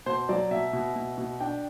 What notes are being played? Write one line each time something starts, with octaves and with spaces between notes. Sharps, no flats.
B2 C5
F#3 D5
B2 E5
B2
B2
B2
D4 G5